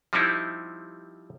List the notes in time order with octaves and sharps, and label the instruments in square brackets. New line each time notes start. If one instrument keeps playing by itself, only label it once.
[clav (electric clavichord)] F3 G3 C4 D#4 E4